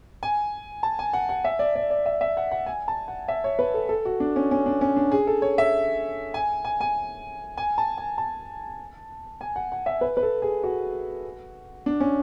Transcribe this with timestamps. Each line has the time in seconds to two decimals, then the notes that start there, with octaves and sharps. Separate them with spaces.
0.23 G#5
0.83 A5
0.99 G#5
1.13 F#5
1.29 F#5
1.45 E5
1.59 D5
1.75 D5
1.90 D5
2.06 E5
2.21 E5
2.37 F#5
2.52 F#5
2.66 G#5
2.88 A5
3.08 F#5
3.28 E5
3.44 C#5
3.59 B4
3.74 A4
3.89 A4
4.05 F#4
4.20 D4
4.36 C#4
4.51 C#4
4.66 D4
4.81 C#4
4.96 D4
5.12 G#4
5.27 A4
5.42 C#5
5.58 E5
6.34 G#5
6.65 G#5
6.81 G#5
7.58 G#5
7.78 A5
7.98 G#5
8.18 A5
9.41 G#5
9.56 F#5
9.72 F#5
9.86 E5
10.01 B4
10.17 B4
10.23 A4
10.42 G#4
10.63 F#4
11.86 D4
12.00 C#4